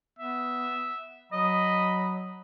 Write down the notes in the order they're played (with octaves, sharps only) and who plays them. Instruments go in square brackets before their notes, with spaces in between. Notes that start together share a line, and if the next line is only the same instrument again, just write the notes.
[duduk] B3 [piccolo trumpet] E5
[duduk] F#3 [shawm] D#5 [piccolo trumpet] B5